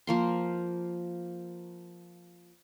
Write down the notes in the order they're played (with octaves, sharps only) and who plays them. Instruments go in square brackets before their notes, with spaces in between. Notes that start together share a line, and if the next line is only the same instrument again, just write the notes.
[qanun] F3 A#3 C6